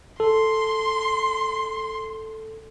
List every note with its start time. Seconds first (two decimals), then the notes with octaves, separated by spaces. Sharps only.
0.20 A4 C6